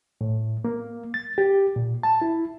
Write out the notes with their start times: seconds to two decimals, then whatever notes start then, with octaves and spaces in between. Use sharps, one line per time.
0.21 A2
0.65 A#3
1.14 A6
1.38 G4
1.76 A#2
2.03 A5
2.22 E4